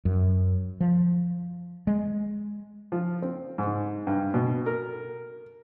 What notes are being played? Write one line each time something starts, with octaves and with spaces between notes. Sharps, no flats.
F#2
F3
G#3
F3
C4
G#2
G2
B2
A#4